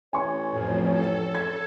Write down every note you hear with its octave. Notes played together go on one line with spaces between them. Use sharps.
A1 C#5 G#5 C#6
F2 A2 F3
A4
G#6